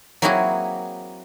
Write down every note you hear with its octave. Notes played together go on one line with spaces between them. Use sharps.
F#3 A#3 C4 E4 F#4 G#4